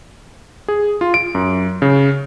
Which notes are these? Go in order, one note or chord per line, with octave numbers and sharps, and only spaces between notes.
G#4
F4
D7
F#2
C#3